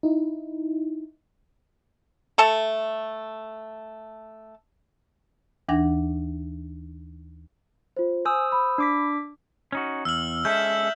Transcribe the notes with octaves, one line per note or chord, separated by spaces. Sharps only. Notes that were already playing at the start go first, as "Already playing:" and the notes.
D#4 E4
A3 A4 A5
D#2 E3 D4 F#5 A#6
F4 C5
C5 G#5 D#6 E6
B5
D4 D6 B6
C#4 D#4 F#4
E2 E6 F6 F#7
G#3 C#4 A4 E5 G6